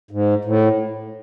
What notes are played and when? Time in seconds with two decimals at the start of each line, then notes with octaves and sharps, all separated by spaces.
0.11 G#2
0.45 A2